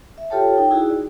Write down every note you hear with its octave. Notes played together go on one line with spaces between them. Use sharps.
E5
F4 G4 A4 C#5 G5 A5
D#4 G5
D#4 E4 F#4 G#4
D5